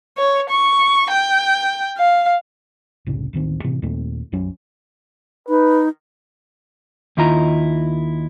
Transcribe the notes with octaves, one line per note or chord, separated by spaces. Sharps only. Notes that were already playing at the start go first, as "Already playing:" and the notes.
C#5
C#6
G5
F5
F#1 C2 A2 C#3
D1 A1 D#3 C4
A2 C3 E3
D#2 A#2 A3 C4
B1 F#2 F#3 C#4
D#4 B4
D#2 D#3 E4 F4 D#5 A#5